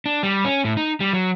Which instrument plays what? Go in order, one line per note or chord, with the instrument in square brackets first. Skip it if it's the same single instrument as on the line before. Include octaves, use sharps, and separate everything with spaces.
[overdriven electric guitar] D4
G3
C#4
A2
D#4
G3
F#3